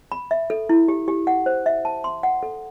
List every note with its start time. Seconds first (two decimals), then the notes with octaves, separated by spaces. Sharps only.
0.12 B5
0.31 E5
0.50 A4
0.69 E4
0.88 G4
1.08 G4
1.27 F#5
1.46 C5
1.66 E5
1.85 A5
2.04 C6
2.23 F#5
2.43 A4